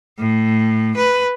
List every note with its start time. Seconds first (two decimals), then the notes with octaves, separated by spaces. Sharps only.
0.19 A2
0.96 B4